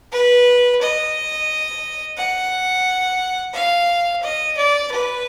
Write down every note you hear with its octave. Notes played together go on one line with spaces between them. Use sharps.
B4
D#5
F#5
F5
D#5
D5
B4